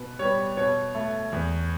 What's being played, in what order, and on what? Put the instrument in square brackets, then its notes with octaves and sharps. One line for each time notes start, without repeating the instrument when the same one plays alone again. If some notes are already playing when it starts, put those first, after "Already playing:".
Already playing: [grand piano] B2 B4
G3 B3 C#5
B2 C#5
A3
E2